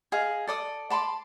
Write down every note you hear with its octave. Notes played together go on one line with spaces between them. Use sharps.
G#4 D#5 F5
A4 D5 D#6
A5 B5 C6 D6